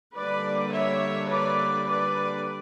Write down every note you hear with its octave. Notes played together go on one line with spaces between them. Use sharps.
D3 G3 A#3 D4 B4 D5
C#5 E5
B4 D5
B4 D5